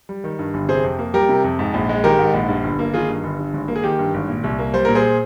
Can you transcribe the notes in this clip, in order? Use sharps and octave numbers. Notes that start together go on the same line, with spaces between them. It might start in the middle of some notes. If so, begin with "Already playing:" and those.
G3
D#3
G2
G1
C3 G#4 C5
F2
A#3
G3 G4 A#4
C3
F2
G#2
A#1
G#3
D#3 G4 A#4
G#2
A#1
G2
G1
A#3
D#3 F4 G#4
G2
G1
G2
G#1
A#3
G#4
D#3 G4
G2
G#1
A#2
C2
A#3
G3 C5
A#2 A#4
G#4 C5